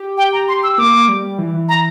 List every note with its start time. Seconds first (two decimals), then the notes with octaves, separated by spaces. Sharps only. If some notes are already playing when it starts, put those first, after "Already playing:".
Already playing: G4
0.17 G5
0.33 A#5
0.48 C6
0.63 E6
0.78 A#3 D6
1.08 G3
1.38 E3
1.54 E3
1.69 A#5